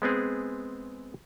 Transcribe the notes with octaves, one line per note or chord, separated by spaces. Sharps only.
G#3 B3 C4 G#4